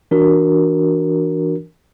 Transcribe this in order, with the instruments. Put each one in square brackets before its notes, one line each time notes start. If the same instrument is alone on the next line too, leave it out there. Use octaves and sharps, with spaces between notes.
[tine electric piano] E3 D4 F#4 A#4